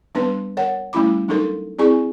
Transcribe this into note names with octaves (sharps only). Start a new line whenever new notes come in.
G3 B3 D4 B4
A#4 C#5 F#5
G3 A3 C#4 E4 B5 D6
F#3 D4 D#4 A4 A#4
C4 E4 G#4 D5 G#5 C#6